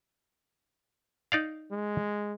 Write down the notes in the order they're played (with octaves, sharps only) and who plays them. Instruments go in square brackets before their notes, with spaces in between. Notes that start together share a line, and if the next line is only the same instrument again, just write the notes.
[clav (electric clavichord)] D#4 D5 F5
[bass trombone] G#3